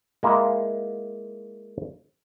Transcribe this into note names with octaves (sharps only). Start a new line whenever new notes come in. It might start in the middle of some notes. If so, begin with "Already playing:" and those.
G#3 A#3 E4 F4